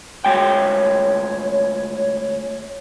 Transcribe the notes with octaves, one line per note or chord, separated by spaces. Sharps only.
D2 G#3 C#5 G5